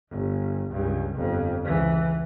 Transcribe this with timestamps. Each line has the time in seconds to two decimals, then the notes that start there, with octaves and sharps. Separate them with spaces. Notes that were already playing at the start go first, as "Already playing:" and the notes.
0.11 G1
0.71 C#2 G2
1.16 G1 F2
1.65 C#2 E3